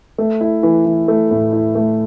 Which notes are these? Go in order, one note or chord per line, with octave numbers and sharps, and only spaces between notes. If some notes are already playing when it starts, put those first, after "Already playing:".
A3
E4
E3
E3
A3
A2
E4
A3